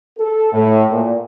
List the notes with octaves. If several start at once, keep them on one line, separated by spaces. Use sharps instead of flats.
A4
A2
A#2